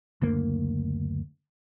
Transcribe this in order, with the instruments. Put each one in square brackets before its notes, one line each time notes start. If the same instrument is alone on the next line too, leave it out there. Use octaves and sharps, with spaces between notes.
[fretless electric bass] F#1 D2 A#3